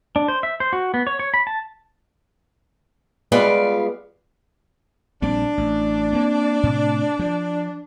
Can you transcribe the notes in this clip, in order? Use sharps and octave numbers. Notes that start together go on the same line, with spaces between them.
D4
C5
E5
C5
F#4
B3
C#5
C#5
B5
A5
G3 G#3 B3 F4 D5 F5
A#1 G3 C4 D4
A1
A#3 C4
A2 C3
F3